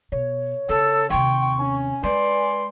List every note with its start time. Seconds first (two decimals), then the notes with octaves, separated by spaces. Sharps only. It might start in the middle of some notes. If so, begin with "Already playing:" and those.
0.12 B2 C#5
0.69 C#3 A4 E6
1.10 D#2 C3 G5 C6 C#6
1.59 C#4 G#5
2.04 G#3 B4 D5 C6